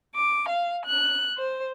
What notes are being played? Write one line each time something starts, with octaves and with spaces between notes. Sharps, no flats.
D6
F5
F#6
C5